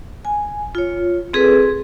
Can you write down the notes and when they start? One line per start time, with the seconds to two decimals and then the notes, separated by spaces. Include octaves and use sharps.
0.25 G#5
0.75 F4 C#5
1.33 C4 G#4 A4 B4